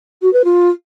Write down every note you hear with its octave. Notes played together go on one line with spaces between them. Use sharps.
F#4
B4
F4